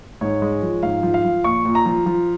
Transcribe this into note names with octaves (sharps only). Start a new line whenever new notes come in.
G#2 C#5
G#3
F3
G#2 F5
F3
F5
F3
A#2 C#6
A#2
A#5
F3
F3